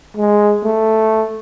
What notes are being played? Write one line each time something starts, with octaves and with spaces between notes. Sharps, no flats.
G#3
A3